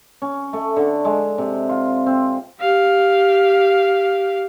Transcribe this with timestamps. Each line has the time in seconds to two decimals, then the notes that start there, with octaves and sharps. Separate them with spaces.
0.22 C#4
0.53 A3
0.76 D3
1.05 G#3
1.38 C3
1.69 F4
2.06 C4
2.60 G4 F5